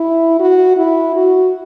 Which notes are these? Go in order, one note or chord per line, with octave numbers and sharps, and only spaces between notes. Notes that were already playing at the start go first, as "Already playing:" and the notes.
Already playing: E4
F#4
E4
F#4